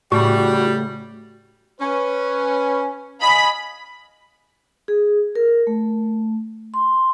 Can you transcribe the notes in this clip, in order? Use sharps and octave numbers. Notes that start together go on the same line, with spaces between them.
A2 C#3 G3 F#4
C#4 B4
D#5 F5 G#5 B5
G#4
A#4
A3
C6